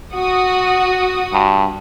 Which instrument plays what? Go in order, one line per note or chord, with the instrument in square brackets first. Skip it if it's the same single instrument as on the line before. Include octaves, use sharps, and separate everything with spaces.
[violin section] F#4 D#6
[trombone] G2